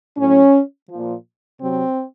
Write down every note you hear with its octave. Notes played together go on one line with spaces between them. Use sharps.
A2 F#3 C#4
F3
A#2
C3 F#3 C4